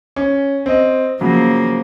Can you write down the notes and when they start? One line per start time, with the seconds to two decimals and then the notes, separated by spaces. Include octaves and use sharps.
0.16 C#4
0.66 C4 D#5
1.21 C#3 F3 F#3 A#3